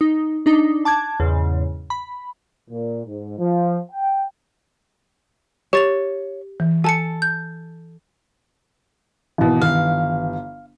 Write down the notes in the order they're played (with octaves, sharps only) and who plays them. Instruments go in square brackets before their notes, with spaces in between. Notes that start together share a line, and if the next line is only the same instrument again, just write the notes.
[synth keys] D#4
D4 D#4
A5 D6 F#6 G#6
E2 G#2 C#3
B5
[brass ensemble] A#2
G#2
F3
G5
[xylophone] G4 A6 F7 [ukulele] C#5
[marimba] E3
[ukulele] A4 [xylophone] G#5 A5 C#7
[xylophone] G6
[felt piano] G#1 B2 [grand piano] E3
[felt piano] G1 [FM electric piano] D#3 [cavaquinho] F5